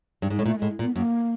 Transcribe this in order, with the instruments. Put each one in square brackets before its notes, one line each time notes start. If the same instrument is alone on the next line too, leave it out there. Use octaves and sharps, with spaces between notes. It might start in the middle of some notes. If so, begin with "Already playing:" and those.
[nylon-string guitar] G2
G#2
[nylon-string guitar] A2 [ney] G#3
[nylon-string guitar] A#2 [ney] A3
[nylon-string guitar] A2 [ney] G#3
[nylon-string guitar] A#2
[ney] B3
[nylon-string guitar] F#2 [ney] A#3